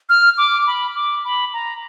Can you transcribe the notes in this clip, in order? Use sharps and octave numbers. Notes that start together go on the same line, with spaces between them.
F6
D6
B5
D6
B5
A#5